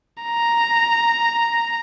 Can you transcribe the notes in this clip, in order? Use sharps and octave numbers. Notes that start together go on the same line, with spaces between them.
A#5